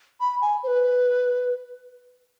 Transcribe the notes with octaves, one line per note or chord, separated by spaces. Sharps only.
B5
G#5
C5
B4